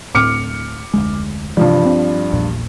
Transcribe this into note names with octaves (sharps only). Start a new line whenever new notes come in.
D1 A2 C4 D6 F6 C#7
F1 D2 G#3
G2 C3 E3 F3 G3
C4
A#1 E2 A#2